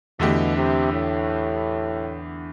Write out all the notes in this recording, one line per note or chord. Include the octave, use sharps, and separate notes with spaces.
E2 B2 D3 A3 E4 G4
C3
A2